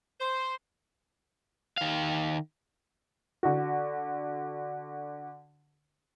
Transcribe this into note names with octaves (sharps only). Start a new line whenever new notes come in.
C5
D#3 F5
D3 F#4